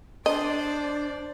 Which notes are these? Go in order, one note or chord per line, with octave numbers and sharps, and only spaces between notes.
D4 C5 D5 D#5